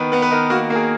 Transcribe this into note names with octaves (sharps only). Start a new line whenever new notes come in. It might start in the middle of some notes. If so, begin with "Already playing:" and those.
Already playing: D#3 B3 B4
B3 B4
B4
D#3 A#4
A#3 F#4
A#3 A#4
G#4